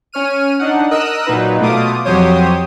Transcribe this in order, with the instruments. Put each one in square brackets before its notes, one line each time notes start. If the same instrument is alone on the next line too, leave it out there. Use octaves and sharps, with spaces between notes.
[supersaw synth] C#4 C#5 F6 D#7
D4 D#4 F#5
A#4 D#5 D#6 E6 F#6
A#2 F#3 D#4 B4
B2 A3 F4 D6 D#6
F2 F#3 G4 C5 C#5 D#6